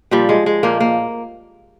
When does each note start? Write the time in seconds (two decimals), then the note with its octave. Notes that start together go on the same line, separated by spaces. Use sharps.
0.11 A#2 F3 G3
0.29 G#3
0.46 G#3
0.63 A#2 F3 A#3
0.80 A#3